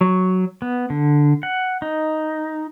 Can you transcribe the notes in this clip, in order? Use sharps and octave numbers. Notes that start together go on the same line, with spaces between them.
F#3
B3
D3
F#5
D#4